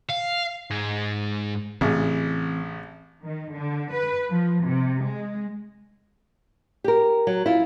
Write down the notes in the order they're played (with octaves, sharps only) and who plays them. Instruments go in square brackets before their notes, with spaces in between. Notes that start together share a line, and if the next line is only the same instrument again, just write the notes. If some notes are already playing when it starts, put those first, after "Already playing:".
[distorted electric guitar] F5
G#2 G#3
[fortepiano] A1 C#3 [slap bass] E3 C4
[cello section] D#3
D3
B4
F3
C3
G#3
[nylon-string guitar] G4 A#4
F#3
E4 F4